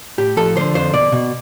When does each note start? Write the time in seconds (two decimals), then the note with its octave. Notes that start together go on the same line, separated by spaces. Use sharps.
0.18 A2 G4
0.37 F3 A4
0.56 D3 C5
0.74 F2 C5
0.93 B2 D5
1.12 B2